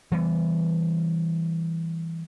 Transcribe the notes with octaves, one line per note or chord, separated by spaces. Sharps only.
E3 G3 B3